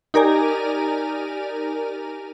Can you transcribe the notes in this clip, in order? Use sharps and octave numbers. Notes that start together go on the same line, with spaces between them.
D#4 G4 A#4 D5 G#5 A#5